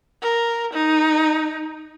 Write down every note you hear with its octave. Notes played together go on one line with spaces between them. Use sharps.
A#4
D#4